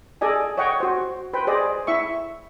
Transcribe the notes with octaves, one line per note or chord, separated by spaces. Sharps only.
G#4 A4 D5 D#5 G#5
C#5 D#5 F#5 G5 C#6
F#4 C5
B4 C5 G5
G#4 C5 D5 D#5
E4 E5 C#6